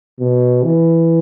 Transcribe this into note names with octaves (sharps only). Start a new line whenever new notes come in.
B2
E3